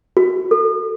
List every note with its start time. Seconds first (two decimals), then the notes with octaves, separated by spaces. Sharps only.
0.17 F#4
0.51 A4